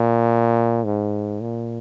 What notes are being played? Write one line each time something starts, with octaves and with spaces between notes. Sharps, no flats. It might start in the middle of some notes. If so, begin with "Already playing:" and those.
Already playing: A#2
G#2
A#2